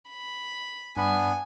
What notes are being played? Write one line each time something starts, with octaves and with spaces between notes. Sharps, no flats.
B5
G2 B3 D4 G#5 B5